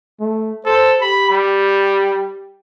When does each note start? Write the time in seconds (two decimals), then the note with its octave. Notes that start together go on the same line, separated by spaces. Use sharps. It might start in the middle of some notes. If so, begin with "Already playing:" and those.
0.20 A3
0.66 A4 C5
1.01 G4 B5
1.30 G3